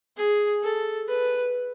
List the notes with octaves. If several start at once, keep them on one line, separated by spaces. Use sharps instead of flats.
G#4
A4
B4